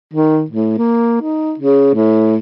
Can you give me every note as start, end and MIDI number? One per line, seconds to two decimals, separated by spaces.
0.14 0.44 51
0.51 0.75 45
0.78 1.19 58
1.22 1.54 63
1.60 1.92 49
1.95 2.36 45